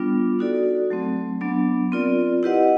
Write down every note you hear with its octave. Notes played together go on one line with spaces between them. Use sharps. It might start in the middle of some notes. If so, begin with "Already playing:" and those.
Already playing: G3 B3 D4 F4
D#4 F#4 A4 D5
F#3 A3 C4
F#3 B3 D4
C4 F4 A#4 D5
E4 G4 B4 D#5 F#5